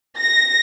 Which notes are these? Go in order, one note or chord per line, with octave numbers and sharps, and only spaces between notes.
A#6